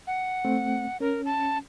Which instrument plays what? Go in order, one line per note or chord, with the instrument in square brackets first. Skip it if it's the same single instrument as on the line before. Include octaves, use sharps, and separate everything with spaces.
[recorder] F#5
[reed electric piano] A3 C4
[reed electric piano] C#4 [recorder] A#4
[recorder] A5